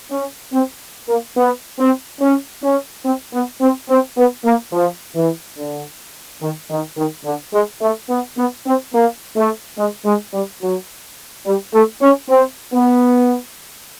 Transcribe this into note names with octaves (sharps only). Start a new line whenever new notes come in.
C#4
C4
A#3
B3
C4
C#4
C#4
C4
B3
C4
C4
B3
A#3
F3
E3
D3
D#3
D#3
D#3
D3
G#3
A3
B3
B3
C4
A#3
A3
G#3
G#3
G3
F#3
G3
A3
C#4
C4
B3